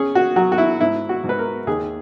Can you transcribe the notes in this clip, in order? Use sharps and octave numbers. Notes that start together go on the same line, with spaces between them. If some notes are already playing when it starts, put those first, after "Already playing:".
Already playing: C#4 G#4
F#4
F#3 F#4
F#4
E4
G#2 E4
F#4
G#2
B4
A#4
D#2 G#4